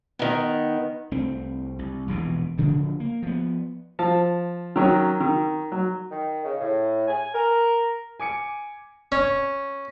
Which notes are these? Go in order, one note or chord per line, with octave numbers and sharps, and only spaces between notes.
D#3 B3
C2 A3 C4
C2
E1 A#1 B2 E3
D2 C#3 F3 D4
A#3
F3 B3
F3 A5
D#3 F#3 C#4
D#3
F#3
D#3
C#3
A2
G#5
A#4
G#5 D6 C#7
C#4